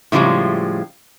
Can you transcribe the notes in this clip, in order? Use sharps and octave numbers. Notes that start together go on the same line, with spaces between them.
A2 C#3 F3 G3 G#3